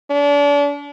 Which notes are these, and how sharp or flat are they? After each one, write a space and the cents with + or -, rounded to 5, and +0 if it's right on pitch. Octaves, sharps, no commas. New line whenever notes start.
D4 -35